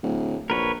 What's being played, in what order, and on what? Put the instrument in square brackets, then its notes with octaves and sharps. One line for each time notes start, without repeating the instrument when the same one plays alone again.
[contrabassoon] D1
[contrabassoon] A#1 [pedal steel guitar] A#4 B4 C#5